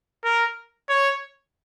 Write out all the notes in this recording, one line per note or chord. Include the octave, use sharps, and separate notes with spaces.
A#4
C#5